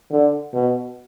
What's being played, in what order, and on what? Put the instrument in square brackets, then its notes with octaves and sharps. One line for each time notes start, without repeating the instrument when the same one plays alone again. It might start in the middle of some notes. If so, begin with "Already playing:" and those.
[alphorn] D3
B2